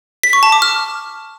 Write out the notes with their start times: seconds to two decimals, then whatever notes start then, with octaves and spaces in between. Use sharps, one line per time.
0.23 B6
0.33 C#6
0.43 A5
0.52 D6
0.62 F6